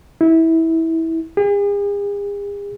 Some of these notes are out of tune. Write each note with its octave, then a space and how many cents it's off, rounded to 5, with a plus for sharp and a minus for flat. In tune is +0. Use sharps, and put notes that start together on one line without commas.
E4 -20
G#4 -45